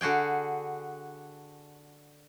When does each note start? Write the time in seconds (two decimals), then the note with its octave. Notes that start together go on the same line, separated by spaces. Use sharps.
0.01 D3 F#4 G#4 G5